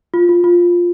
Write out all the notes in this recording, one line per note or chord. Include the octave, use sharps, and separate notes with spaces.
F4
F4
F4